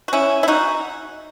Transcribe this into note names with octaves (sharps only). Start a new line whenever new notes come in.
F#4
C#4 E4
E4
D#4 F#4